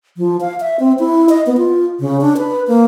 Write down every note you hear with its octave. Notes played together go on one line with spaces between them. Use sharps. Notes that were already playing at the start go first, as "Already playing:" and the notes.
F3
F5
E5
C4
E4
D#5
B3
F4
C#3
D4
B4
A#3